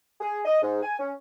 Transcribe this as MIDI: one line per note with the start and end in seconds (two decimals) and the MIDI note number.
0.21 0.40 68
0.45 0.61 75
0.63 0.81 44
0.83 0.99 80
0.99 1.11 61